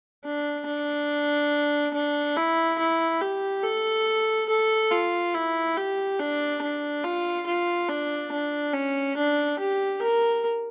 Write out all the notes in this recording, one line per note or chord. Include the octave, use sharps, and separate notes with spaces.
D4
D4
D4
E4
E4
G4
A4
A4
F4
E4
G4
D4
D4
F4
F4
D4
D4
C#4
D4
G4
A#4